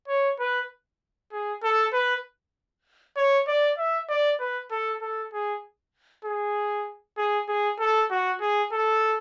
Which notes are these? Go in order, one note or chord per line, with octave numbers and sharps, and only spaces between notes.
C#5
B4
G#4
A4
B4
C#5
D5
E5
D5
B4
A4
A4
G#4
G#4
G#4
G#4
A4
F#4
G#4
A4